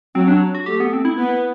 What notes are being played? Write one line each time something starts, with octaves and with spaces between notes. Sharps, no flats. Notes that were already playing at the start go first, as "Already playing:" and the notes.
F#3 C4
D4
F#4
A3 G4
B3
C4
E4
B3